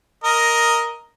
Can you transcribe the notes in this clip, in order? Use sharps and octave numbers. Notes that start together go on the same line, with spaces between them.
A#4 D#5